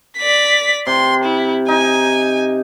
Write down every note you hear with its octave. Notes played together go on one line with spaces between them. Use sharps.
D5 B6
C3 C6
E4
D#4 G#5